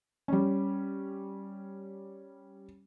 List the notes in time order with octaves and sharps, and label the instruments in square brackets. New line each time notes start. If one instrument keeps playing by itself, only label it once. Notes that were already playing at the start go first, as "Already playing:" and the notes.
[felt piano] G3 C#4